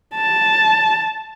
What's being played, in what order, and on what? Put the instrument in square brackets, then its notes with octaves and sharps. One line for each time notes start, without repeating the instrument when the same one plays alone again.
[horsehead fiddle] A5